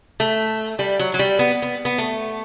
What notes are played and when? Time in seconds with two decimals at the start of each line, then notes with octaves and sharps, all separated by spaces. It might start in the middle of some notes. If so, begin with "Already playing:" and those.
0.20 A3
0.79 G3
0.99 F#3
1.14 F#3
1.19 G3
1.39 B3
1.62 B3
1.85 B3
1.98 A3